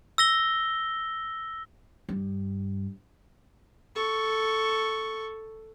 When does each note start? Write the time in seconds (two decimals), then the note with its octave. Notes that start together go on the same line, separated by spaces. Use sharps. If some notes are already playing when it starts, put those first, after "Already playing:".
0.18 E6 A#6 G7
2.09 G2
3.95 A4 C#6